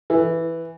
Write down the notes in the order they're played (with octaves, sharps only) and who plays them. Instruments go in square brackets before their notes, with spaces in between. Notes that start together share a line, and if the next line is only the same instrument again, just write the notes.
[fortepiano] E3